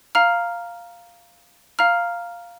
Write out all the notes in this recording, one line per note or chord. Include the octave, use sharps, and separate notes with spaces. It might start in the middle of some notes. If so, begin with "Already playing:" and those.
F5 A#5 F6
F5 A#5 F6